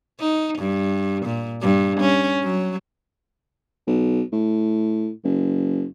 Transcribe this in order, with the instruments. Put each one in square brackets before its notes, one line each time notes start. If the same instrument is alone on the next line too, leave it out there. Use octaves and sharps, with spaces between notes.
[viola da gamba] D#4
G2
A#2
G2
C#4
F#3
[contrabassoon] B1
A2
F#1